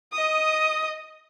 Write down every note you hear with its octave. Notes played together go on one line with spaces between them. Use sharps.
D#5 D#6